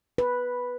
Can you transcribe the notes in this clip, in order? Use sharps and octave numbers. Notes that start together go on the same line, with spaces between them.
B4